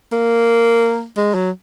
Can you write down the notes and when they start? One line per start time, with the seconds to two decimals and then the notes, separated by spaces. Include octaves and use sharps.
0.12 A#3
1.17 G#3
1.34 F#3